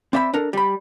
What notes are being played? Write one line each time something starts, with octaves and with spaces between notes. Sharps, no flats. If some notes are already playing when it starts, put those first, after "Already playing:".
C4 D5 E5 G5 B5
D4 A4 A#4
G3 B5